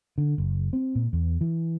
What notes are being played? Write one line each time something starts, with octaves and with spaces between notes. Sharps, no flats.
D3
F#1
C4
A#2
E2
E3